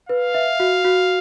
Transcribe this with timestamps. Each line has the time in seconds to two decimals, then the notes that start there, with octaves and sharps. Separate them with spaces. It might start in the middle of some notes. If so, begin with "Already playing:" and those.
0.09 B4 F5
0.34 E5
0.60 F#4
0.85 F#4